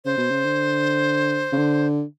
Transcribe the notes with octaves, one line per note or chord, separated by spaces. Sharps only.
C#3 C5
B2
C#3
D3
C#3
D3